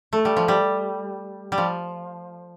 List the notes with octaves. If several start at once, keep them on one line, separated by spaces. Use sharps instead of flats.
A3
G3
F3
G3
G3
F3